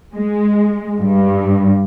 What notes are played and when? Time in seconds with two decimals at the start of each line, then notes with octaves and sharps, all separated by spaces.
0.15 G#3
1.00 G2